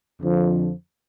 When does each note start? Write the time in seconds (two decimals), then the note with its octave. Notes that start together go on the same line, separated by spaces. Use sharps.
0.20 F2 D3 F3